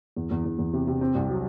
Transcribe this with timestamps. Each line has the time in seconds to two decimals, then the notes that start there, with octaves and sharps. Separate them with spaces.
0.16 E2
0.31 E2
0.45 E2
0.59 E2
0.73 C3
0.87 C3
1.01 C4
1.15 C2
1.29 F#3